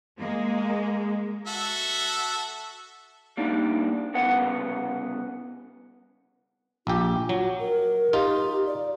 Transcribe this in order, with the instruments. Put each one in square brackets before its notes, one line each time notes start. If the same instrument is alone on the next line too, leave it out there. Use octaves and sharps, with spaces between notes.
[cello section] G#3 A#3
[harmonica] F#4 A4 E5
[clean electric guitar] G3 A#3 D4 D#4
C2 C#3 B3 F#5
[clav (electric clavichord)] A#1 G4 [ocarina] F4
[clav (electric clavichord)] F#3 [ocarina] F#4
[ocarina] A#4
[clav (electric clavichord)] D#4 F4 [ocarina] G4
[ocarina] D5